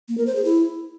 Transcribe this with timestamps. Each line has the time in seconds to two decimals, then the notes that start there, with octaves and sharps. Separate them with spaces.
0.09 A#3
0.18 A#4
0.27 C5
0.36 G#4
0.45 E4